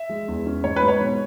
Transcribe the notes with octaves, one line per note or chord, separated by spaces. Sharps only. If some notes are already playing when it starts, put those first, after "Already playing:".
Already playing: E5
G#3
E2
C#4
G#2 C#5
B4
G#2
C#5
B2